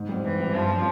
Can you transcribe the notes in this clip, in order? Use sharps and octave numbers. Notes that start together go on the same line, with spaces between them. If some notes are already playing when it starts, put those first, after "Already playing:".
Already playing: G#2
G3 C4
G#2 E3
G3 C4
G2 F3
G3 C#4